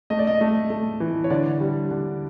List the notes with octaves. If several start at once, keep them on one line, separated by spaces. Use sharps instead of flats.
A3 D#5
D5
D#5
A3
A3
E3
C#5
D3 D5
G3
D3